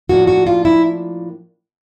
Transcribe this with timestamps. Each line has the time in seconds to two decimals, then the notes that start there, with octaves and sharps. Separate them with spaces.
0.09 A2 F3 A#3 D4 F#4
0.27 F#4
0.46 F4
0.65 E4